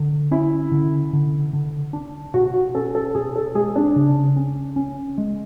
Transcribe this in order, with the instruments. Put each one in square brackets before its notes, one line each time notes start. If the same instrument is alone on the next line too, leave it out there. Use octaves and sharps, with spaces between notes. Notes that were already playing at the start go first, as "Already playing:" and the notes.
Already playing: [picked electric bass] D3
[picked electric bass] C#4 [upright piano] E4
[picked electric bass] D3
D3
D3
D4
[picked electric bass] B2 [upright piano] F#4
[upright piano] F#4
[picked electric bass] C#4 [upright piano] A4
[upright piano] A4
[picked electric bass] B2 [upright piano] G#4
[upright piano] A4
[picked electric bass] G#3 [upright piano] G#4
[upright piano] D4
[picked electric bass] C#3
C#4
C#4
G#3